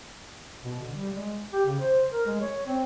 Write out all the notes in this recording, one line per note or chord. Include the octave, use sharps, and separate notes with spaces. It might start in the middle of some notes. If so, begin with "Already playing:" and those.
B2
D3
G3
G#3
G4
C#3
C5
A#4
G#3
C#5
C4